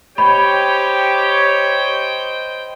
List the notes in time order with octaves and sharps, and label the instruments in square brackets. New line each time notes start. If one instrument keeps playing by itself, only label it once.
[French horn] G4 [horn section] C5 D#5 G5 [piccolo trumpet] C#5 [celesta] B5